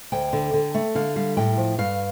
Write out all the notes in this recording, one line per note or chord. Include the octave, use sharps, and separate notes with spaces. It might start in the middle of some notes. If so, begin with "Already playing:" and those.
D2 G5
D3
D3
A3
D3 F5
G3 F5
A2 G5
F3
G2 F5